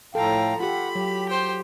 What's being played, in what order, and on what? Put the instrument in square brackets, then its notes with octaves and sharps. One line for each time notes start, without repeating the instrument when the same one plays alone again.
[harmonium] A2 F5 G5 [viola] F3 A#5 [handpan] A4
[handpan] F4 G4 [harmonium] F#5 [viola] B5
[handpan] F#3 [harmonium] G4
[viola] C5 G5